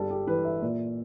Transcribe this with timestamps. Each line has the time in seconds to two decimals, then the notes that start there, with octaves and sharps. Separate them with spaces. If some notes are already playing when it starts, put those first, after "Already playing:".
Already playing: G1 G3 A4
0.10 G4
0.27 E3 B4
0.45 E5
0.62 A#2